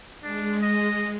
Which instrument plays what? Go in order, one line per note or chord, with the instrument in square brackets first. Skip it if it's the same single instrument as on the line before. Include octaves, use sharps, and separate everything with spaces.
[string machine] G#3 [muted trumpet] D4
[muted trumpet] D#5